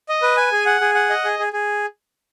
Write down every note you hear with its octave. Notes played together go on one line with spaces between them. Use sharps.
D#5
B4
G#5
G#4
F#5
G#4
F#5
D#5
G#4
G#4
G#4